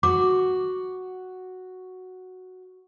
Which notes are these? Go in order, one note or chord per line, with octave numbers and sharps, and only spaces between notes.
F#4 D6